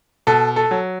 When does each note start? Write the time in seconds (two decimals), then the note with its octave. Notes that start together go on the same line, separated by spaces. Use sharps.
0.27 B2 A4
0.56 A4
0.71 F#3